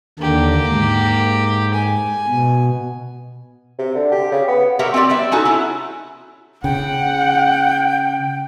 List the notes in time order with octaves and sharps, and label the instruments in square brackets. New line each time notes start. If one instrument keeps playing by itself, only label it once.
[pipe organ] D#2 D3 [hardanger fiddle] A#3 G4
[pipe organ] G#2
[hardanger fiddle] G#5
[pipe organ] B2
[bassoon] C3
D3
G4
C#3
B3
[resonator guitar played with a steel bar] G4 A#4 C#5 E5 F#5
C4 F#4 G4 D5
G3 B3 E5
C#4 D#4 F#4 A4
E4 C#5
[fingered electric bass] C#3 [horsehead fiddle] F#5 [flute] G5